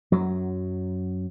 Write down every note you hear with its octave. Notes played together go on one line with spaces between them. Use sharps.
F#2 F#3